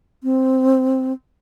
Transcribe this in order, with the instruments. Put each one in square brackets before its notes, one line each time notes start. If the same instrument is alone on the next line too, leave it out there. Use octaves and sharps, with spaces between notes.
[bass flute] C4